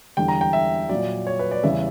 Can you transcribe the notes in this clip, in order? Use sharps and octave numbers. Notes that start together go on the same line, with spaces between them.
E2 D3 G3 G5
A#5
G5
E5
F#3 D5
A#2
C#5
B4
D5
E2 C#3 E3 G3 E5